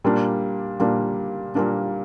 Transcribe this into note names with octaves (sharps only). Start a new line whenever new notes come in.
A#2 G3 A#3 D4
A#2 G3 A#3 D4
A#2 G3 A#3 D4